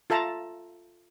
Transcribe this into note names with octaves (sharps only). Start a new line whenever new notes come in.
F4 A4 E5 A5 A#5